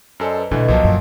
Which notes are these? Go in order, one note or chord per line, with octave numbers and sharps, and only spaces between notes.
F#2 A4 C5 D5 D#5 G#5
B4
D2 B2 D3 E3 A4 B4 D#5
C2 A#2 F3 F#3 D#5 A5
F#2